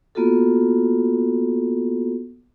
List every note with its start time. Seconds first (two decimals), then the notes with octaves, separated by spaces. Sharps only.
0.15 A#3 B3 F4 F#4 A4